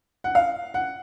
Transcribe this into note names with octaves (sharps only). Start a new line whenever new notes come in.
F#5
F5
F#5